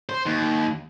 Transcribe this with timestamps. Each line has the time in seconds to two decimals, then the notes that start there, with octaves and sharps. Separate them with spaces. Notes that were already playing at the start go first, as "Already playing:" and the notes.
0.09 C5
0.26 D#2